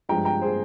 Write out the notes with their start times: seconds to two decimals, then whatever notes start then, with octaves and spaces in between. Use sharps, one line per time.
0.09 G2 F3 G#3 G5 A#5
0.25 G5 A#5
0.41 G#4 C5